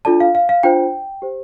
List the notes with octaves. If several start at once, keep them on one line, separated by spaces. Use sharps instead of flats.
D4 F4 A4 D5 A5
F5
F5
F5
D4 F4 C5 G5
G4 C5